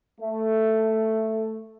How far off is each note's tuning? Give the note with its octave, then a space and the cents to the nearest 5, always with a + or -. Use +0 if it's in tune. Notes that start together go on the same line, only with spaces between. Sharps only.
A3 +5